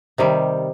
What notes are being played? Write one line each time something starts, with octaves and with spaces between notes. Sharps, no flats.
C3 D#3 G3